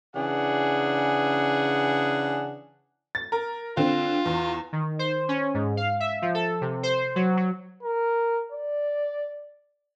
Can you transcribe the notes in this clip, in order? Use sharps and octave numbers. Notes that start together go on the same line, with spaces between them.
C#3 E3 D4 G#4 F#5
A6
A#4
D3 C4 F4
E2
D#3
C5
C#4
G#2
F5
E5
F3
A4
C3
C5
F#3
F#3
A#4
D5